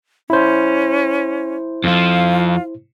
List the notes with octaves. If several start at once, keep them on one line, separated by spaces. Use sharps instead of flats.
C#4 E4 C5
F2 F3 F4